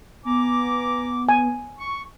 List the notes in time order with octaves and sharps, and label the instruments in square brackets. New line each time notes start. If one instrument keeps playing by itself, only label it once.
[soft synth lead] B3 [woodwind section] G#5 A#5 D6
[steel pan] G#5
[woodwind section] C#6